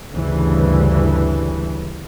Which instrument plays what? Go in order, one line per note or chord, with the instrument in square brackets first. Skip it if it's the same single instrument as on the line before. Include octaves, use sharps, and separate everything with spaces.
[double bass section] D2 G2 C#3 E3